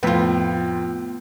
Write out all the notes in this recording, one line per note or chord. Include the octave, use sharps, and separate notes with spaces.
F2 A2 B3 F4